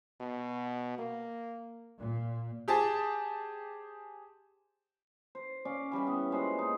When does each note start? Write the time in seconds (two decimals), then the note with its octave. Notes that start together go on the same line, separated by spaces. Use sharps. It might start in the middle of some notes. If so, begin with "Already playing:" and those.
0.20 B2
0.99 A#3
1.97 A#2
2.68 G4 G#4 C5 A5
5.35 C5
5.65 C#4 D5 F5
5.92 E3 G3 C#4 B5
6.07 B3
6.31 A#2 G#3 C5 B5
6.58 D#4